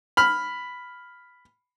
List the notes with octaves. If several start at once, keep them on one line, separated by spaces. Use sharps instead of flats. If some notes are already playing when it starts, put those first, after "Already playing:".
B5 F6